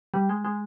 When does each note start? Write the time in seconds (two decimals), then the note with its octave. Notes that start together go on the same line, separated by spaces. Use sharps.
0.14 G3
0.29 G#3
0.45 G#3